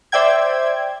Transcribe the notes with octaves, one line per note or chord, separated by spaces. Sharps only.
C5 D5 E5 G5 G#6